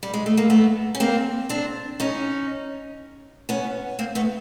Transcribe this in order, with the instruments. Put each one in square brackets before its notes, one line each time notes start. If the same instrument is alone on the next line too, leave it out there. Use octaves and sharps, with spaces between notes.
[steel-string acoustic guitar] G3
G#3
A3
A#3
A3 B3
C#4
A#3 C4
C4 D4
C#4 D#4
B3 C#4
A#3 C4
A3 B3